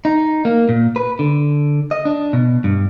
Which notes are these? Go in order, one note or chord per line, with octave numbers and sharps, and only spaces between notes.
D#4
A#3
A#2
B4
D3
D#5
D4
B2
G2